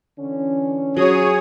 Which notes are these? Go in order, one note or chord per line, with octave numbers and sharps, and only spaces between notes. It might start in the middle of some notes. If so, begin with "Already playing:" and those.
D3 E3 C#4
F#3 G#4 C#5 D#6